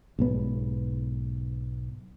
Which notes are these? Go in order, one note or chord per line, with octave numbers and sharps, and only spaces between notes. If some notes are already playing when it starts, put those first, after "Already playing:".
B1 G#2 B3